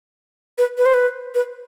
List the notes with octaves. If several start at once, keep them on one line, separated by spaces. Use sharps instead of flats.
B4
B4
C5
B4
B4